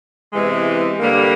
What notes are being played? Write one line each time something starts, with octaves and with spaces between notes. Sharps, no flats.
E2 C3 E3 G#3
G2 D3 G3 A#3